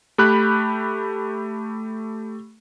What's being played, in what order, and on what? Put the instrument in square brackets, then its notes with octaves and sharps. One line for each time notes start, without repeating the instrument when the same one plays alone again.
[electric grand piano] A3 G4 B5 F#6